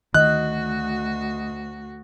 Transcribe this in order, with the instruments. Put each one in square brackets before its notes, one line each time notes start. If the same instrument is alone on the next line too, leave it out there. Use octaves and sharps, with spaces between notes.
[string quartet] D2 F#4 [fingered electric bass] D#3 [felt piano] D#5 [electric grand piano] F#6